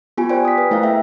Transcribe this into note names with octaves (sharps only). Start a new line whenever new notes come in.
B3 F4 G4 G#5
A#4 C5 D5 G5 G#5
D#6 B6
B4
A3 E4 A#4 F5
G#4 A#4 E5 G5